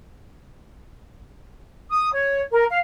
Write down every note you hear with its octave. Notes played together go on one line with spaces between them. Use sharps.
D#6
C#5
A#4
F5